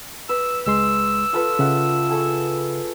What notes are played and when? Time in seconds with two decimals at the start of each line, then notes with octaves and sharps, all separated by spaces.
0.29 B4 E6
0.66 C#2 G#3 C6 E6
1.33 F4 A4 B4
1.59 C#3 E5 F#5
2.10 G#4 A4 C#6